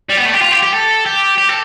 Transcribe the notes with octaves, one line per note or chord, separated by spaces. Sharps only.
G3
B3
A3
G4
F4
G4
G4
A4
G4
G4
A4